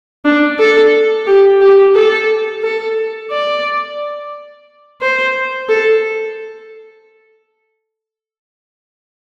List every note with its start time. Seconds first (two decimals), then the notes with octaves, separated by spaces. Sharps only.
0.25 D4
0.59 A4
1.27 G4
1.61 G4
1.95 A4
2.63 A4
3.31 D5
5.02 C5
5.69 A4